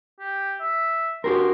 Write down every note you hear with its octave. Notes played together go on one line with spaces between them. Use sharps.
G4
E5
F#4 G4 A#4 C6